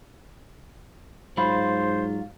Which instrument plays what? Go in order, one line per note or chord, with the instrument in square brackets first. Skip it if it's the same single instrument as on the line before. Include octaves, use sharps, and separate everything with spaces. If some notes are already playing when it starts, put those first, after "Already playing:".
[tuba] G#2 [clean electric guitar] F#3 F4 [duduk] C5 [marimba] B5